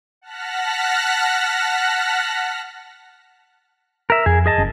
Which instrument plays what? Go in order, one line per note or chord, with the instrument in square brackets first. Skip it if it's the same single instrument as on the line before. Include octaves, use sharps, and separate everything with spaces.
[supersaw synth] F#5 A5 F6 F#6 A#6 B6
[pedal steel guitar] A#4 E5
[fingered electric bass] F2 [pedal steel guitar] G#4
[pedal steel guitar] G#4 D#5 A5
[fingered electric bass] F#1 C#4